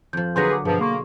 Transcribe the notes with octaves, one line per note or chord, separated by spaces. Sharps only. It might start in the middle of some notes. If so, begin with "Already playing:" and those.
F2 F3 G6
D3 F#3 A#3 G#4 B4 C6 G6 A#6
D6
G2 B2 F3 G#4
A#3 G#4 C6 C#6